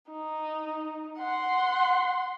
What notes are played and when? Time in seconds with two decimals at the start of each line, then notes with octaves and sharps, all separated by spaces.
0.11 D#4
1.19 F#5 C6